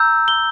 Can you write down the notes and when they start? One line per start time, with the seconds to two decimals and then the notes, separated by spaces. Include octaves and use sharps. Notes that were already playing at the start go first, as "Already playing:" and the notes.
Already playing: A#5 E6 G6
0.28 G7